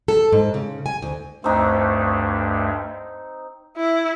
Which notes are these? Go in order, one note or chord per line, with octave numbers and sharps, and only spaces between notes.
A4
G#2
C#3
G#5
D2
D2 G2 A3 C4 D#4
E4